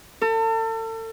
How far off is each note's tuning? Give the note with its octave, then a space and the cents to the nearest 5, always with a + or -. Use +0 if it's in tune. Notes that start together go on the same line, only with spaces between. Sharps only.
A4 +35